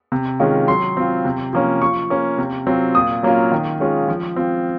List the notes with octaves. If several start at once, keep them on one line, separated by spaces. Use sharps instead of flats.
C3
D#3 G#3 C#4 F4
F#3 C6
C4 F4
C3
F3 A#3 C#4
F3 C#6
A#3 C#4
C3
F#3 C4 F4
A#2 D#6
F#3 A#3 C#4 F4
D#3
G#3 C#4 F4
F3
C4 F4